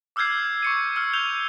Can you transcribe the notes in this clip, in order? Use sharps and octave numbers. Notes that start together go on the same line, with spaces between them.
D6 E6 F6 G6 G#6 C7
C#6 C#7 D#7
E6 F6 C#7
G6 F7 G7